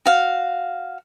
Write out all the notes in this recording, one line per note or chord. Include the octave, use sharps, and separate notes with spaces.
F#4 F5